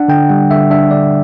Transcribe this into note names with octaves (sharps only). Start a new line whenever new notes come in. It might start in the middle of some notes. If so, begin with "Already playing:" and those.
Already playing: D4 F#5
D3 G5
G3 F#5
D3 E5
D4 E5
D3 D5